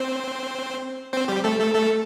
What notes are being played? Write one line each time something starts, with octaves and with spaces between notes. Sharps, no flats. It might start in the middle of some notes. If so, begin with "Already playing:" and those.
Already playing: C4 C5
C4 C5
G3 G4
A3 A4
A3 A4
A3 A4